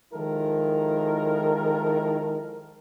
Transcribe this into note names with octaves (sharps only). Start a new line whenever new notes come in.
D#3 F3 G#3 E4 A4 A#4